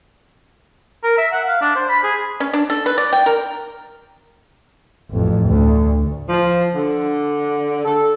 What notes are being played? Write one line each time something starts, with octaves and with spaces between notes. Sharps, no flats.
A#4
E5
F#5
F5
D4
C5
B5
G#4
C#4
D4
A4
B4
D5
G5
A#4
A1 F2
D2
F3
D3
A4